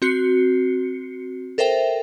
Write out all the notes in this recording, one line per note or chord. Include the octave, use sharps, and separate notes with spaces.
C4 F#4 C7 C#7
A4 A#4 C5 E5 G5